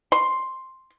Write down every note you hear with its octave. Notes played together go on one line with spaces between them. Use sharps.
C6